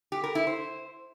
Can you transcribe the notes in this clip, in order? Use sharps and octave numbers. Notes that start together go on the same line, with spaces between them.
G4
A#4
E4
C5